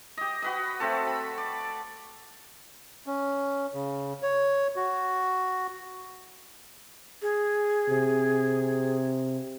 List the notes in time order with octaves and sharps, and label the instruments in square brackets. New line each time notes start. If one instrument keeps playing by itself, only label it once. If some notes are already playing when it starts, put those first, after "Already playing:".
[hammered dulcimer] G4 D#5
F#4 B4 D#5
A3 C4 F#4 A4
B5
D5
[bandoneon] C#4
C#3
C#5
F#4
[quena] G#4
[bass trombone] C3